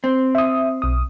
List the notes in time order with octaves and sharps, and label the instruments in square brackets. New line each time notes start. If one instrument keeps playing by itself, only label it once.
[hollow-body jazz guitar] C4
[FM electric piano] E5 D#6
B1 D#6